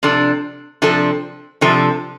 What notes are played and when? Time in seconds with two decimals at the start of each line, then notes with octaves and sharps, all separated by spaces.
0.03 C3 F3 D4 A4
0.82 C3 F3 D4 A4
1.61 C3 F3 D4 A4